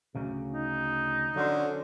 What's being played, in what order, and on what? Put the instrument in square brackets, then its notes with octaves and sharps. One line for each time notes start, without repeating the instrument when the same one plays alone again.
[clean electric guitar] D2 C#3 F#3
[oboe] D#4
[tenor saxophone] D3 [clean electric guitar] F#3 C#4 C5